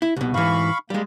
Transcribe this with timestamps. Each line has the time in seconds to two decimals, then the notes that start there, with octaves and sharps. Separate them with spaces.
0.02 E4
0.16 C2 B2
0.34 G#2 E3 F5 B5 C#6
0.90 G3 G#3 A#3